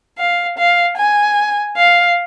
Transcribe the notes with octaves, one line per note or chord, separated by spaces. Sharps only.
F5
F5
G#5
F5